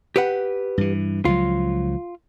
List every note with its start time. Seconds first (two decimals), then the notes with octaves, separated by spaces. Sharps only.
0.16 G4 B4 F#5
0.78 G2 E3
1.25 C#2 F3 F#3 F4